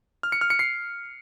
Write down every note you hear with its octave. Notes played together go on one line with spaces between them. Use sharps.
F6
C#7
F6
C#7
C7